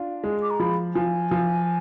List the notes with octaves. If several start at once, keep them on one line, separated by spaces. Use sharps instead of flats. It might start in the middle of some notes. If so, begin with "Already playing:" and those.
Already playing: D4 F4
G#3
D6
A#5
F3 B5
F3 G#5
F3